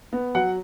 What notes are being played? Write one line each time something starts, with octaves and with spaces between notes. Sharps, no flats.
B3
F#3 F#5